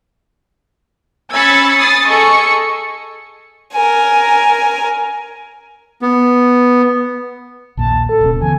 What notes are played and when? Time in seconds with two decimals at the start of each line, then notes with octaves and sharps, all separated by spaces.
1.32 C#4 B5 E6 G#6 A6 C#7
1.78 D#6 A6 C7
2.08 G#4 A4 D#5 C#6 E6 C#7
3.73 A#4 G#5
6.02 B3
7.77 A#1 D#2 A#2 A5
8.09 A4
8.21 D1 B2 C#4
8.41 D3 E3 B3 G#5